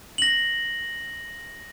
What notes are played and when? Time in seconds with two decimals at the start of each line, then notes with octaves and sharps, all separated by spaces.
0.18 A#6 F#7